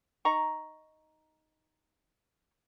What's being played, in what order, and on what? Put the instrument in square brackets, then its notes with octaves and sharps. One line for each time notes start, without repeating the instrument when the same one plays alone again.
[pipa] D#4 A#5 C#6